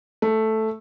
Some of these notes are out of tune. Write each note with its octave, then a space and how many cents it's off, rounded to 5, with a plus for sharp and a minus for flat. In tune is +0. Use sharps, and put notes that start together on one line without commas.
A3 +0